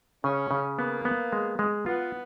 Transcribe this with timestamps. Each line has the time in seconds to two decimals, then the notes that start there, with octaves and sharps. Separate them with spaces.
0.24 C#3 C#4
0.51 C#3
0.78 A#3 B3
1.05 B3
1.32 G#3
1.59 G#3
1.86 B3 F4